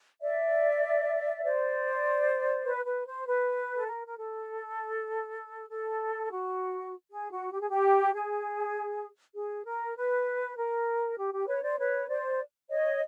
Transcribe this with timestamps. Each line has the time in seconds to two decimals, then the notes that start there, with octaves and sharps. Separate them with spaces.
0.22 D5 E5
1.43 C5 D5
2.66 B4
2.86 B4
3.06 C5
3.26 B4
3.77 A4
3.87 A#4
4.06 A#4
4.17 A4
5.69 A4
6.31 F#4
7.11 G#4
7.32 F#4
7.51 G4
7.61 G#4
7.70 G4
8.13 G#4
9.35 G#4
9.65 A#4
9.96 B4
10.56 A#4
11.17 G4
11.33 G4
11.48 B4 C#5
11.62 C5 D5
11.78 B4 C#5
12.08 C5 D5
12.69 C#5 D#5